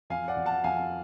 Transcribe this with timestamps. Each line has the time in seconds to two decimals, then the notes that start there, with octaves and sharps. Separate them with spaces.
0.10 F2 F5 G#5
0.28 D5 F#5
0.37 F2
0.46 F#5 A5
0.64 F2 F5 G#5